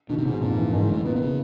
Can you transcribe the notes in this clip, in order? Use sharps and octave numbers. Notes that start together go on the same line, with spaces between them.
B2 D#3
C3
G#2 B2
F2 A#2
E3
F#1 G#2
F#1 A2
A#2 B3
C3
C#3